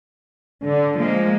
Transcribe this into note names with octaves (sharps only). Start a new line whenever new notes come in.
D3
F3 G#3 A#3